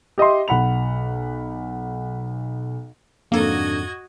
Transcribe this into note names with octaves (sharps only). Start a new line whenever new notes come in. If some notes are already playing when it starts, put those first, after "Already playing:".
G4 D#5 E5 C6
B1 F#5 B5 F7
F2 G#2 D3 A#3 F#4 A4 D#5 G#6